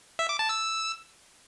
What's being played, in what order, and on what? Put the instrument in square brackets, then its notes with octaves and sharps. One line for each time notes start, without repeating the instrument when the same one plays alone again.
[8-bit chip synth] E5
D6
A5
E6